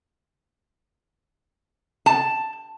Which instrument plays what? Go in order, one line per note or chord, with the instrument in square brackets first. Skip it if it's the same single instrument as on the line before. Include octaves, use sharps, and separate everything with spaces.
[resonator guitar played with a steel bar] A5